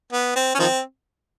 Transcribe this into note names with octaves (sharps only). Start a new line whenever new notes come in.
B3
C4
C#4
D#3 F3 C4